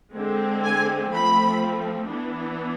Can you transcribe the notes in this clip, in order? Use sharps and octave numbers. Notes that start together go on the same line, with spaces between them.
D3 G#3 C4
G#5
F3 A3 C4 B5
E3 B3 D4